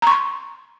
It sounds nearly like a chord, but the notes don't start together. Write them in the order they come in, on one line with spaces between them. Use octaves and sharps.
A#5 C#6 C6